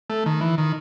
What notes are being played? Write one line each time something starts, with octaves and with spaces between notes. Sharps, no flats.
A3
D#3
E3
D#3